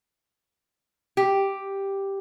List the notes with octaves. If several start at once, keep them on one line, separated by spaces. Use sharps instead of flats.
G4